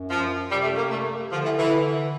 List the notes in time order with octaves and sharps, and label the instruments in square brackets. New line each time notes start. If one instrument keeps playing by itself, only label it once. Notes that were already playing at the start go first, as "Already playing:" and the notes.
Already playing: [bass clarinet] F#2
[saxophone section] F3
[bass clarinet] C3 [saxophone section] G3
[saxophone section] A3
A#3
A3
[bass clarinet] D3 [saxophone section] F3
[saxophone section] E3
E3